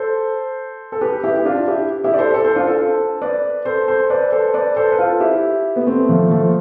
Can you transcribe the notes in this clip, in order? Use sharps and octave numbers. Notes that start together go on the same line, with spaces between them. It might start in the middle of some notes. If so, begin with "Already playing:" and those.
Already playing: A4 C5
A4
G4 B4
E4 G4
G4
D4 F4
E4 G4
E4 G4
D5
A4 C5
A4 C5
A4 C5
D4 F4
F4 A4
A4 C5
B4 D5
A4 C5
A4 C5
B4 D5
A4 C5
B4 D5
A4 C5
B4
F4 A4
E4 G4
B3
A3 C4
F3 A3
F3 A3